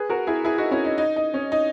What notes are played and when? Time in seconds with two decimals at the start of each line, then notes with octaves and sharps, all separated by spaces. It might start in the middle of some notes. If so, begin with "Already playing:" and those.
Already playing: G#4 B4
0.09 F#4 A#4
0.27 E4 G#4
0.45 E4 G#4
0.58 D#4 F#4
0.71 C#4 E4
0.85 D#4
0.98 D#4
1.16 D#4
1.34 C#4
1.52 D#4